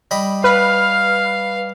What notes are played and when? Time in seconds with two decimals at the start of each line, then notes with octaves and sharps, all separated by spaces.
0.11 G3 D#5 B5
0.44 B4 F5 F6